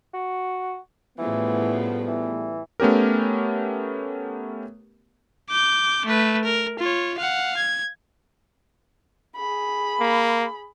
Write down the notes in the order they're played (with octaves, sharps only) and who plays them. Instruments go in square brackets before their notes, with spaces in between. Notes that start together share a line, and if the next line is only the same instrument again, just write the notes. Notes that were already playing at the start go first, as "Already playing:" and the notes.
[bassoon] F#4
[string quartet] A2 C#3 F3 [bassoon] E3 [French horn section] G3 A3 B3
[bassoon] E3
[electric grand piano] A3 B3 C#4 G4 A#4
[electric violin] D6 G6
A3 B4
A#4
F4 C#5
F5 F#5
G#6
[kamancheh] G#4 B5
[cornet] A#3